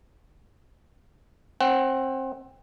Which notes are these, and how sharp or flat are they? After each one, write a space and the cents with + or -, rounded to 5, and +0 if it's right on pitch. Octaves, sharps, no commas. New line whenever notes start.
C4 +25 F#5 +30